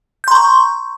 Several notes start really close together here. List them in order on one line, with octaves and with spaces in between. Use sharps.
G6 C6 A#5 C#6